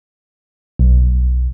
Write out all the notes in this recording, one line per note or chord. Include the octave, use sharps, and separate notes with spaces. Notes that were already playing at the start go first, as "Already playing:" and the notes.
B1